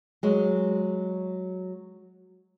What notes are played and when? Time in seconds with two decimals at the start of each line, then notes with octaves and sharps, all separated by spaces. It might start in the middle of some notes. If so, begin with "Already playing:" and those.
0.23 F#3 G#3